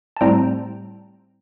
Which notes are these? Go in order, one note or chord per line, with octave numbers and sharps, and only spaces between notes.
A5
A2 G3 C4 G5 A#5